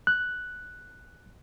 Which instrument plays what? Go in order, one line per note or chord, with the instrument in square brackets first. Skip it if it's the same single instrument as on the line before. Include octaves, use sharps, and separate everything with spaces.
[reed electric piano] F#6